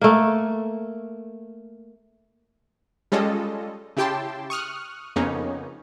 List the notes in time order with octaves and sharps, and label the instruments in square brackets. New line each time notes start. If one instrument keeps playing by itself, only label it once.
[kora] A3 A#3
[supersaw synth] G3 G#3 C#4 F4 A4 D#5
C#3 E4 G4 G5 A5 C6
C#6 D#6 F6 F#6
F2 C#3 A#3 B3 C#4 D#4